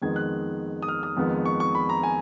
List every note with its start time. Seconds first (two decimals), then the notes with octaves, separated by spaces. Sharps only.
0.02 F2 D#3 G#3 B3 G#6
0.16 F#6
0.82 D#6
0.88 F6
1.03 D#6
1.17 F2 D#3 G#3 B3
1.46 C#6
1.60 C#6
1.75 B5
1.89 A#5
2.03 G#5